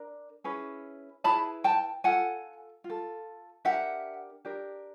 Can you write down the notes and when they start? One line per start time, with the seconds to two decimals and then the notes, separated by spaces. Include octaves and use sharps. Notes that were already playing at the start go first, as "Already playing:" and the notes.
Already playing: D4 A#4
0.44 C#4 E4 G#4 B4
1.24 C#4 E4 G#4 B4 A5 B5
1.64 G5 A5
2.04 F4 A4 F#5 G#5
2.84 F4
2.90 A4
3.65 D4 G4 A#4 E5 F#5
4.45 D4 G4 A#4